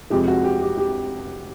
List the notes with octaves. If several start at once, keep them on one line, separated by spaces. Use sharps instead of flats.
F1 F2 C3 F3 G#3 G4
F#4
G4
G4
G4